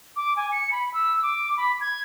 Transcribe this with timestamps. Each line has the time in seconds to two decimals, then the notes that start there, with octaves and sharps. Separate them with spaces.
0.16 D6
0.37 G#5
0.52 C#7
0.72 B5
0.94 E6
1.23 D6
1.57 B5
1.81 G#6